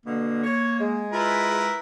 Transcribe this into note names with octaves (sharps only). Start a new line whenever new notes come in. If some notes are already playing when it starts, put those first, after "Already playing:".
B2 D3 A#3
C#5
G#3
E4 F4 A#4 B4